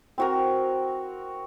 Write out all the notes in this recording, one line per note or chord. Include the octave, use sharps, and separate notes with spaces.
C4 F#4 A#4